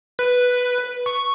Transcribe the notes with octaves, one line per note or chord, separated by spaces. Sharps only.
B4
C#6